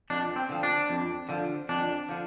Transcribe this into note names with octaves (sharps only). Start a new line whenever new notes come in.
F2 D4
C4
D3 F3
D4
F2
D3 F3
F2 D4
D3 F3